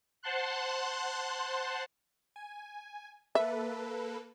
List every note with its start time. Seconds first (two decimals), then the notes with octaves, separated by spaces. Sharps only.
0.23 C5 F#5 A5 C6 F#6
2.36 G#5
3.35 A#3 A4 B4 E5